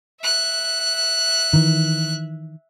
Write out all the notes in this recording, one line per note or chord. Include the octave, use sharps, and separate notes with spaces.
E5 F#6
D#3 E3